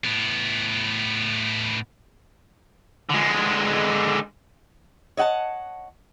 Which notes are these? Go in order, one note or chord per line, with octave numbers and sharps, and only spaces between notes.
A2 B3
D3 G#3
C#5 D#5 F#5 G#5 A5